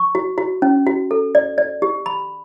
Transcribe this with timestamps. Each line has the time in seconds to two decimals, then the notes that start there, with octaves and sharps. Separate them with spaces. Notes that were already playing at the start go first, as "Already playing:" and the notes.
Already playing: C#6
0.15 F#4
0.38 F#4
0.62 C#4
0.87 F#4
1.11 A4
1.35 D5
1.58 D5
1.82 G4
2.06 B5